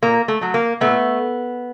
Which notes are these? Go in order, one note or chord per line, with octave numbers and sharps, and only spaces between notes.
A#2 A#3
A3
F#3 A3
A#3
A#2 A3 B3